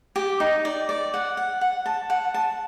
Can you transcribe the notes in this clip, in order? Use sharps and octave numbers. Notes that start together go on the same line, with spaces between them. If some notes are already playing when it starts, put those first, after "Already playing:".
G4
D#4
D5
D5
F#5
F#5
F#5
A5
F#5
A5